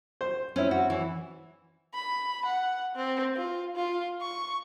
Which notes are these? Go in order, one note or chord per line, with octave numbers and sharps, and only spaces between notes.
C5
C4 C#4 E4
F#4
E3
B5
F#5
C4
F4
F4
C#6